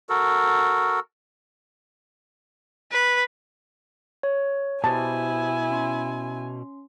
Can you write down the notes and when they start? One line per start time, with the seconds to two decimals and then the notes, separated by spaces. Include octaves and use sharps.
0.09 F#4 A4 A#4
2.92 B4
4.23 C#5
4.84 B2 E4 G4 C5 G#5 A5
5.70 C#4 C6